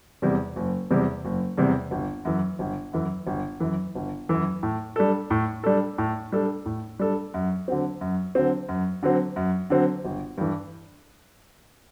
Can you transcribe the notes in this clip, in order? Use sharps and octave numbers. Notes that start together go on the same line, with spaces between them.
E2 C3 G3
F#1
E2 C3 G3
F#1
E2 C3 G3
G1
F#2 E3
G1
F#2 E3
G1
F#2 E3
G1
F#2 E3
A2
G3 D4 A4
A2
G3 D4 A4
A2
G3 D4 A4
A2
G3 D4 A4
F#2
D3 F#3 C4
F#2
D3 F#3 C4
F#2
D3 F#3 C4
F#2
D3 F#3 C4
G1
G2 E3